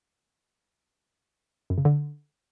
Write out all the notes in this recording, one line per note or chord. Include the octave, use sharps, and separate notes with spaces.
F#2
C#3
D3